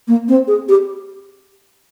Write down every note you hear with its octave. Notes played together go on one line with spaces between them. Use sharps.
A#3
C4
G#4
G4